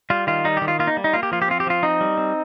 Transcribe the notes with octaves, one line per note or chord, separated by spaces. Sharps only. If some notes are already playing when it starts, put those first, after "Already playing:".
G3 F4
D#3 F4
G3 D#4
D#3 G4
F4
A#3 F4
D#4
G3
D#4
A#3 F4
G4
F3 F4
G4
C4 F4
G4
F3 F4
C4 D#4
G3
C4